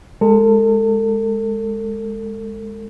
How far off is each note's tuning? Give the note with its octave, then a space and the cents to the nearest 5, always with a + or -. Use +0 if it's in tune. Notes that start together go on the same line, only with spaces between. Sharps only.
G#3 +0 A4 +35